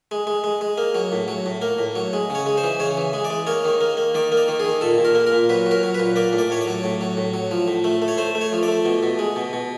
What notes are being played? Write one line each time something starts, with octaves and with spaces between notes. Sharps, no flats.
G#3
G#3
G#3
G#3
A#3
F#3
A2
F#3
A2
A#3
A2
F#3
G#3
C#3 C#5
G#3
C5
E3
C#3 C#5
E3
G#3
D5
G#3
A#3 C#5
D#3
A#3
A#3
D#3 D5
A#3
D5
D#3
D#3 G#4
A#2 A4
A#2
A#4
A#3
A#4
A#2
F#3 B4
F#3 A#4
F#3
B4
A#2
A#3 D5
A2
D5
A2 C#5
D5
F#3
A2
F#3
A2
F#3
F3
A2
A3
A3
C#5
A3 C5
A3
C#5
F3
D5
A3
B2
B2
G#3
B2
B2